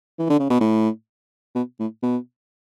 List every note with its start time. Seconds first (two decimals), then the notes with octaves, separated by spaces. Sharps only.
0.19 E3
0.29 D3
0.39 C#3
0.50 B2
0.60 A2
1.55 B2
1.80 A2
2.03 B2